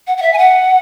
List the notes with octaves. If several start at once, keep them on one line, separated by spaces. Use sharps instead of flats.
F#5
F#5
E5
G#5
F#5